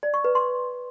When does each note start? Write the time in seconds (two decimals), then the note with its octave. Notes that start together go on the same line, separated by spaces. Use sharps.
0.03 D5
0.14 C#6
0.24 B4
0.35 C6